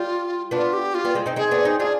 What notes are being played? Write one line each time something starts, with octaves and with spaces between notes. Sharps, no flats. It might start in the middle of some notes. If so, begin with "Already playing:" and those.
Already playing: G3 F4
B3 D4 F4
G4
F4
G3 B3
G#3 C4
C4 D#4
C4 D#4 G#4
B3 D4
C4 D#4
D4 F4 G#4